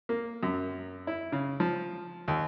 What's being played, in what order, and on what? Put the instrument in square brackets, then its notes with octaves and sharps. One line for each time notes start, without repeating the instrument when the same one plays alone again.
[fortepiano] A#3
F#2
E4
C#3
F3
D#2